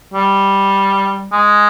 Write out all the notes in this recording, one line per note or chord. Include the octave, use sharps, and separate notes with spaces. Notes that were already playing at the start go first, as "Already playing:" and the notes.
G3
G#3